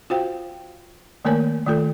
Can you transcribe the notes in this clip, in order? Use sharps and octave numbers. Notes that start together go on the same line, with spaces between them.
F4 F#4 C5 F5 G5
D#3 A3 A#3 A#4 C#5 G#5
D#3 A3 F4 A4